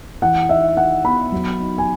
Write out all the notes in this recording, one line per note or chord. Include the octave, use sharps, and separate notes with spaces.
E3 F#5
D#4 E5
D#4 F#5
B3 B5
F#3
D#4
G#5